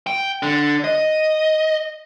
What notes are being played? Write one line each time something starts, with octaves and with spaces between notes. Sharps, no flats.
G5
D3
D#5